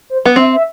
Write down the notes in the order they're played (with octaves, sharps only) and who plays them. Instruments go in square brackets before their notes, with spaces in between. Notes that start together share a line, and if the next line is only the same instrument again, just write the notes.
[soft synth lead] C5
[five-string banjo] B3
[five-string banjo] C4 [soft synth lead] E5
[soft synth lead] E5